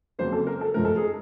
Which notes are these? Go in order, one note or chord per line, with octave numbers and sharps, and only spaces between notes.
F2 C#3 F#3 A#3 C5
A4
A#4
A4
G#2 F3 A3 A#4
A4
G#4